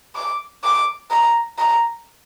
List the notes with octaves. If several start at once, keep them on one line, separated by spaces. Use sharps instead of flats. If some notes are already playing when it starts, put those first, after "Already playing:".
D6
D6
A#5
A#5